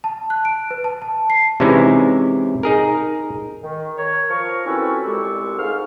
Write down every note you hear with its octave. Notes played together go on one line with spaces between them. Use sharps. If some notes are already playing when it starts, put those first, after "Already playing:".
A5
F#6
D7
B4
A5
A5
C7
C3 E3 G#3 C#4 D#4 E4
D#4 G#4 A#4
D#3
A#4 C#5
F3 A#4 C#6
C4 C#4 E4 F#4 A4 B4
C2 A#2 G#3 G4 A4 C#6
G#2 F5 F6